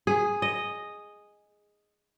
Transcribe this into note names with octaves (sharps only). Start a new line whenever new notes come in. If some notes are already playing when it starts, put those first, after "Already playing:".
G#4
D#5